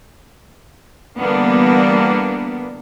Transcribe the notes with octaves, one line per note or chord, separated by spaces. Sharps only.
D3 E3 G3 A#3 B3 D4